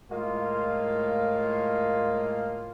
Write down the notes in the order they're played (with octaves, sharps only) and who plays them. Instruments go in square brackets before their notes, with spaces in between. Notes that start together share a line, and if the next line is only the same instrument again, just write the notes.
[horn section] A2 G#3 A#3 F4